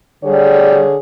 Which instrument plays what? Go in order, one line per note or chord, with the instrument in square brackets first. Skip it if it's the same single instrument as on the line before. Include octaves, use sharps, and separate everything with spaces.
[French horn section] D3 G#4 C#5 [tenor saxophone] G3